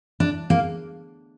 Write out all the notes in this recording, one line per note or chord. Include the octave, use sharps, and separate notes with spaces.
D4
A#3